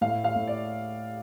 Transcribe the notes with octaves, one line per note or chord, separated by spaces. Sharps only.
A2 F5
F5
A2
D5